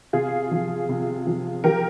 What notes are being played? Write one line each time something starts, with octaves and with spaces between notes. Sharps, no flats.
C3 F4 G#4
F3
C3
F3
F3 G4 A#4